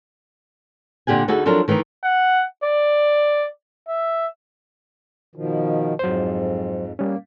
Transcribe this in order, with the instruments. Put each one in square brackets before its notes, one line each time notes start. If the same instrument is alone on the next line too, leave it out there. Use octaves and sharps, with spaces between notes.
[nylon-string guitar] A#2 D3 G4 F#5 G#5
D2 D#4 E4 F#4 G#4 A4
F3 F#3 D4 A4 A#4
D#3 E3 A3 D4 D#4
[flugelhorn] F#5
D5
E5
[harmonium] B2 D#3 F3
[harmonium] F2 G#2 [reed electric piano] F#3 C5
[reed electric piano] G3 C#4 [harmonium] A#3